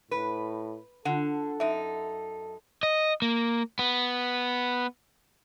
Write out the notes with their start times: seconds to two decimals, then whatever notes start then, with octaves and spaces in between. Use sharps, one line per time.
0.11 A2 B4
1.05 D3 F4 A4 F#5
1.60 F#2 D#4 E5
2.83 D#5
3.22 A#3
3.79 B3